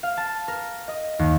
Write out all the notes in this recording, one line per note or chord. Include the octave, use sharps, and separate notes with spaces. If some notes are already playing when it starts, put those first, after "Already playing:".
F5
A5
A#4
D#5
D#2